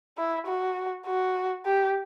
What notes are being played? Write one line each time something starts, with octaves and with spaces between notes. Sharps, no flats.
E4
F#4
F#4
G4